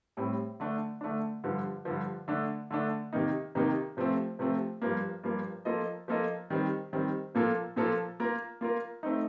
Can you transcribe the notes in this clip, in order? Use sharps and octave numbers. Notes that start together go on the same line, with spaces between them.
A2 G3 C4
D3 A3 D4
D3 A3 D4
G2 D3 F3
G2 D3 F3
D3 A3 D4
D3 A3 D4
C3 D#3 A#3 D#4
C3 D#3 A#3 D#4
C3 F3 A3 C4
C3 F3 A3 C4
G2 F3 A#3
G2 F3 A#3
F3 A#3 F4 A4 D#5
F3 A#3 F4 A4 D#5
D#3 G3 C4
D#3 G3 C4
A#2 F3 A#3 F4 A4
A#2 F3 A#3 F4 A4
A#3 F4 A#4
A#3 F4 A#4
A3 C4 D#4